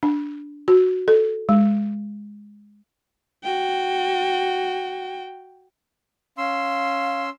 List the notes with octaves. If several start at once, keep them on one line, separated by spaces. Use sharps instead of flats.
D4
F#4
A4
G#3
F#4 G5
C#4 F5 C6 E6